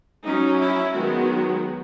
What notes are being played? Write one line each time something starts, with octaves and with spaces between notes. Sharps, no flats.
F#3 C#4 D#4
E4
D#3 F#3 G#3 B3 F#4